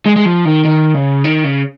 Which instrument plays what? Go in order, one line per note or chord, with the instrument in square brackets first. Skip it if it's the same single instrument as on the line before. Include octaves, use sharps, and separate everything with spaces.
[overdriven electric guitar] G#3
G#3
F3
D#3
D#3
C#3
D#3
C#3